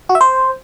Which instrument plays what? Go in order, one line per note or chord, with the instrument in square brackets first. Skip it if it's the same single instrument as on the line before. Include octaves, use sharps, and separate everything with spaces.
[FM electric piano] F#4
E5
C5